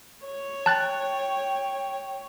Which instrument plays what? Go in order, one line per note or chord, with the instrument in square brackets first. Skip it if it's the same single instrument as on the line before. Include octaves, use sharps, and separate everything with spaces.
[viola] C#5
[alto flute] G5 [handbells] A5 F#6 A6